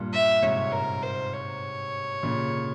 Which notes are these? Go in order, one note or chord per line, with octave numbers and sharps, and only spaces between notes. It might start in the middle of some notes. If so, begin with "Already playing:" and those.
Already playing: G2 A#2
E5
G#2 C3 C#5
A#4
C5
C#5
A#2 C#3